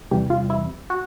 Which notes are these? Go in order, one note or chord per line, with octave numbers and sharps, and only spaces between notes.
E2 C3 E3 G3 G4
F4
E4
F#4